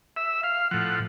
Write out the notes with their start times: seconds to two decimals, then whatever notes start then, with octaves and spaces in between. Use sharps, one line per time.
0.16 E5
0.43 F5
0.71 A2 F3 F#5